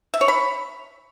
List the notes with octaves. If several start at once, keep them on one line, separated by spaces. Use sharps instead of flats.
E5
C#5
B5